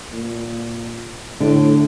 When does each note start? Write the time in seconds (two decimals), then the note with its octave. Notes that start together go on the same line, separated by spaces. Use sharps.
0.13 A#2
1.40 A2 D3